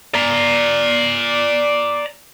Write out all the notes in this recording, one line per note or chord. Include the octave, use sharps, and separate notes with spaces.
D5 A#5